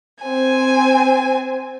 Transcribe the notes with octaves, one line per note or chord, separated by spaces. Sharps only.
C4 G#5